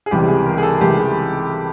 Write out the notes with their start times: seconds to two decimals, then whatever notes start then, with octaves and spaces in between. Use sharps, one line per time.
0.06 G#4
0.11 C#2 C3 E3 G3 G4
0.29 G#4
0.46 A#4
0.58 G#4
0.63 A4
0.81 C#2 C3 E3 G3 G4
0.98 G#4